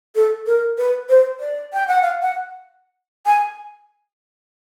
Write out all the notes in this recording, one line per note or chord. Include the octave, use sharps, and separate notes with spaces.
A4
A#4
B4
C5
D5
G5
F#5
F5
F#5
G#5